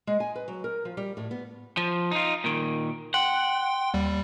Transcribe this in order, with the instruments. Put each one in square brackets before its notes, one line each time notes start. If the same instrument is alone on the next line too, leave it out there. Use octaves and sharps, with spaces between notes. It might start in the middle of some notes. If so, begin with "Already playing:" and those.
[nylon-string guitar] G#3
G#5
B4
F#3
A#4
F3
G3
A2
B3
[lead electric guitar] F3
D#4 F4
A#2 D#3
[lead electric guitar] F#5 [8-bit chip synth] G5 C6
[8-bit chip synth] D#2 G3